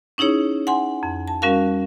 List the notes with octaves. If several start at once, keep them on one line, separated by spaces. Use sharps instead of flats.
C#4 D#4 E4 G#4 C#5
F#5 G#5 C6
F2
A5
G3 C#4 F#4 A#4 F5